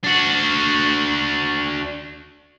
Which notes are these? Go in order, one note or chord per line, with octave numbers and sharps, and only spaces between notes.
D4 F#4